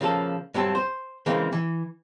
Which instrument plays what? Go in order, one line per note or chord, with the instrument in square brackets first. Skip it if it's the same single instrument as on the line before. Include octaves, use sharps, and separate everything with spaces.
[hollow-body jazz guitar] C#3 F3 A#3 A4
G2 F#3 C4 A4
C5
C#3 E3 G#3 A#3 C4
E3